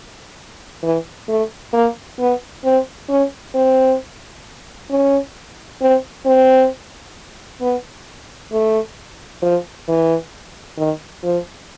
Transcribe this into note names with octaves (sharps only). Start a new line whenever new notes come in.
E3
A3
A#3
B3
C4
C#4
C4
C#4
C4
C4
B3
A3
F3
E3
D#3
F3